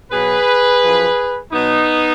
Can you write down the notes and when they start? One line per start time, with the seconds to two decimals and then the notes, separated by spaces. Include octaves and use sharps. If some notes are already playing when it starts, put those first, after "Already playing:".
0.11 B2 F#3 G#4 B4
0.82 F#2 F3
1.52 B2 F#3 B3 D#4